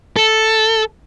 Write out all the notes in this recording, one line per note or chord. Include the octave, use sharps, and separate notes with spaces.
A4